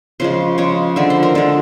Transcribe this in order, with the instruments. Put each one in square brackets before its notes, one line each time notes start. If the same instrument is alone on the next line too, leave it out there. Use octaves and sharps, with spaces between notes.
[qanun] C#3 F3 G#3 C5
C#3 F3 G#3 C#5
D3 F3 G#3 E5
C5
A#4
D3 F3 G#3 A4